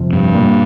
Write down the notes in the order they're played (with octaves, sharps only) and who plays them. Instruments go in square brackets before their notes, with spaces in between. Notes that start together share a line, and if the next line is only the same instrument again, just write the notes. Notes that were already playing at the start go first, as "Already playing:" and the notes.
Already playing: [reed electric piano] F2 C3 F3
[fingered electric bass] G2
[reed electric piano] A#2 G3 A#3